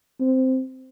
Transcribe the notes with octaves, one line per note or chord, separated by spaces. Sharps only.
C4